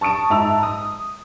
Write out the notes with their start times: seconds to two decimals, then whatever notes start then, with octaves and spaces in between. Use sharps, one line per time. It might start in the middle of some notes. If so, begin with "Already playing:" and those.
0.01 A5 C#6 D#6 D7 E7
0.30 G#2 E5 A5 A#5 E6 F7
0.63 D#6